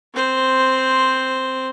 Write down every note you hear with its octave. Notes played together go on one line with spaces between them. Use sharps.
C4 C5